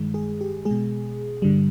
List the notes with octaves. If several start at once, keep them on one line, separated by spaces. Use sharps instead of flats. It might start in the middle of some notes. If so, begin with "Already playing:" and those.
Already playing: G2 D#3 G#3
G#4
G4
G#3 G#4
B2
G2 D3 G3